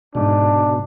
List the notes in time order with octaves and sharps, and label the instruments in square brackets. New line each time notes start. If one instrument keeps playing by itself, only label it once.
[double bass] G#2 [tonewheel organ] B2 [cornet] D4